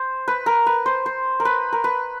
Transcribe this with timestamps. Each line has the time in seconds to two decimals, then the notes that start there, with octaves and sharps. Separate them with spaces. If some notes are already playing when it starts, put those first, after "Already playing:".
Already playing: C5
0.28 B4
0.46 A#4
0.67 B4
0.86 C5
1.06 C5
1.40 A#4
1.45 B4
1.73 A#4
1.84 B4